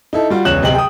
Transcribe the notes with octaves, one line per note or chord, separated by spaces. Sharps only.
D#4 E4 A4
G3 F4 F#4
E1 C#2 C#5 F#6 E7 F#7
D1 C3 D#5 G5 F#7
G5 D#6